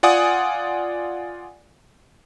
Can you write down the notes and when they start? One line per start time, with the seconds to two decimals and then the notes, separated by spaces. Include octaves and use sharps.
0.03 F4 D5 F#5 G#5 D#6